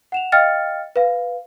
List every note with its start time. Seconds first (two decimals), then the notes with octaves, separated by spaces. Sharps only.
0.12 F#5 E7 F7
0.32 D#5 F5 G5 F6 A6 C#7
0.96 B4 F5